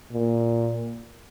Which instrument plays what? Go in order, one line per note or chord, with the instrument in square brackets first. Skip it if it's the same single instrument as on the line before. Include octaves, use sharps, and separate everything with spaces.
[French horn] A#2